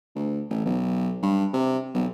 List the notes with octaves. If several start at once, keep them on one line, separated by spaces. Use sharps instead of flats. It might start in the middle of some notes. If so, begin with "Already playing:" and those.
D2
A1
B1
G2
C3
B1